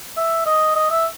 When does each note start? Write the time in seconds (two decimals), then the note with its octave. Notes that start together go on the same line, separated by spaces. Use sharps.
0.17 E5
0.46 D#5
0.76 D#5
0.91 E5